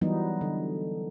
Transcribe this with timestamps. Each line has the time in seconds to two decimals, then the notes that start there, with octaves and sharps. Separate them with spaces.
0.01 E3 F#3 G3 B3 D#4
0.41 D3